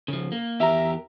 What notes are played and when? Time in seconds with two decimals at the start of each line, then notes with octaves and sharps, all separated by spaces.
0.08 C#3 F3
0.32 A#3
0.60 E2 G4 A#4 E5 A#5